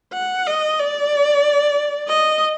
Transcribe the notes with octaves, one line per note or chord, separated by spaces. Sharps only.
F#5
D#5
D5
D#5